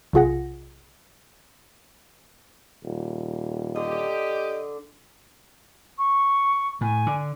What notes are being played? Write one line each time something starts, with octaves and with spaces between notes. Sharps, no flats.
B1 C3 F4 G#4 F#5 A#6
D#1
D3 G4 D#5
C#6
A2 G#5
D3